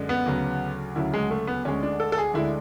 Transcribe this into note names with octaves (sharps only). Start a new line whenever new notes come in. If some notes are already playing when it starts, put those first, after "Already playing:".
Already playing: F#2 D3 G#3
B3
D2 C#3 F#3
D2 C#3 F#3 E4
G#3
A3
B3
D2 D3 G#3 C#4
D4
A4
A4
G#4
D2 D3 G#3 E4